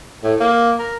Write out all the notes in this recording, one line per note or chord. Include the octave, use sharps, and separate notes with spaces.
A2
A#3
A#4